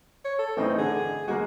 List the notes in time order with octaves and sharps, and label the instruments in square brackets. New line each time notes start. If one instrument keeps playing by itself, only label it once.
[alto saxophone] C#5
A4
[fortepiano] A2 C4 D#4 [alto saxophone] E3
[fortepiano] D3 [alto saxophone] G#4
[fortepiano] G#3 A#3 [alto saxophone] F#4